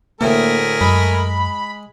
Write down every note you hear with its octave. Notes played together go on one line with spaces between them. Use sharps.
D2 A2 A3 A#3 G#4 A#4
F#2 G#3 B5